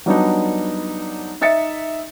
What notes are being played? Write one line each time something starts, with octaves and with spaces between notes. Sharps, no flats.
F#3 G3 B3 D4 D#4
D#4 D#5 E5 A6 C#7